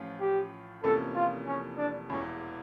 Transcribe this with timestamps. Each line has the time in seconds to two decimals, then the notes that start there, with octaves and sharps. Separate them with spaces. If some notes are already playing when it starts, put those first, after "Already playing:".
Already playing: A1 A2 F3 C#4 F4
0.21 G4
0.83 F1 F2 E3 A#3 C#4 A4
1.16 F4
1.47 C#4
1.78 D4
2.10 E1 E2 E3 C#4